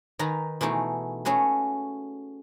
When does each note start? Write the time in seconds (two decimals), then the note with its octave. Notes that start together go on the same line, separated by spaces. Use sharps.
0.19 D#3 D#4 B4 G#5 A#5
0.61 B2 E3 A3 D#4 G#4
1.25 A3 C#4 F#4 G#4 B4